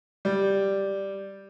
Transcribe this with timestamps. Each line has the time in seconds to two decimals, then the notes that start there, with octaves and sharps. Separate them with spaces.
0.25 G3